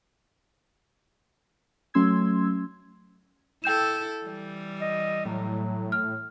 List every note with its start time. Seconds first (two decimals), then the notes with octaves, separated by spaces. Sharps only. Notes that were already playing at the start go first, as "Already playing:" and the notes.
1.94 F#3 A3 C#4 C6 E6 G#6
3.64 E4 A4 G5 G6 E7
4.24 E3 G3
4.81 D#5
5.25 A2 F#3
5.92 F6